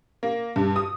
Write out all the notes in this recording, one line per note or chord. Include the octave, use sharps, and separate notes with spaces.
A#3
G2
D#6